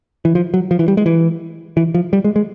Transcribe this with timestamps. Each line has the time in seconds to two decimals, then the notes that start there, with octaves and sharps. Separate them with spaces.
0.25 E3
0.35 F3
0.54 F#3
0.71 F3
0.79 E3
0.88 G3
0.97 G#3
1.06 E3
1.77 E3
1.94 F3
2.13 G3
2.24 G#3
2.36 G#3